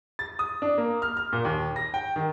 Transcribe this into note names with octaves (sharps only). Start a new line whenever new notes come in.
A6
D#6
D4
A#3
F6
F6
A#2
D#2
A#6
G5
D#3